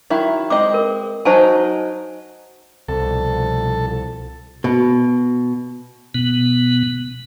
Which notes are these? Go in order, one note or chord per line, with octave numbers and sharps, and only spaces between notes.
D#3 F#3 E4
G#3 C4 D#5 D6
A#4
F#3 D#4 F#4 C5 G#5 A5
C2 B2 F3 A4
B2
B2 B3